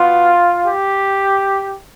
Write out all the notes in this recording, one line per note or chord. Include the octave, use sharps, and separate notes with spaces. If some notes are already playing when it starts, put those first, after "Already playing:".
Already playing: B2 B3 F4
G4